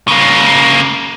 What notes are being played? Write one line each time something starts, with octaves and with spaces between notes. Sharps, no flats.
C#3 A#3